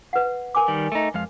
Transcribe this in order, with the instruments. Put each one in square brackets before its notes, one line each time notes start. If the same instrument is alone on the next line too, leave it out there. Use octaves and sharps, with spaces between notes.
[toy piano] B4 F#5
A#4 G#5 D6
[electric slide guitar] D#3 G3
A3 D#4
F2 G#3 F5